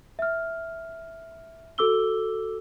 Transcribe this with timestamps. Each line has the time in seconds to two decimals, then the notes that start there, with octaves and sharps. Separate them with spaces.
0.19 E5 F6
1.78 F#4 A4 D6 E6 G7